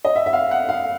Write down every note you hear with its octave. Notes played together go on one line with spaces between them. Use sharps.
D#5
E5
E5
F5
F#5
F5